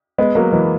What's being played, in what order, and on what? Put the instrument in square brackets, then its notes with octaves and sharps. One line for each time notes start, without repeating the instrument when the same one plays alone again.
[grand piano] G#3 B3
F#3 A#3
E3 G#3